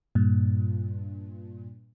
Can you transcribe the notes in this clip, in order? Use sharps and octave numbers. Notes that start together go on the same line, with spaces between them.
G2 A#2